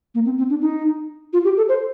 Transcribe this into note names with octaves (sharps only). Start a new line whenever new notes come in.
A#3
C4
C4
D4
D#4
F4
G4
A4
C5